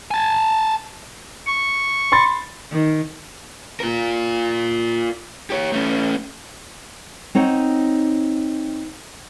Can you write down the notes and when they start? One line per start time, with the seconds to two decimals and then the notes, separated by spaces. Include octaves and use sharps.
0.11 G#5 A5
1.46 C#6
2.12 B5 C6 A6
2.71 D#3
3.80 F4 A#4
5.50 G4 C#5
5.72 A3 C#4
7.35 C4 D#4 C#5 F#5